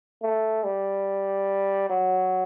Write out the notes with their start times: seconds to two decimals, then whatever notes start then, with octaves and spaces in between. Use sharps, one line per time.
0.23 A3
0.64 G3
1.90 F#3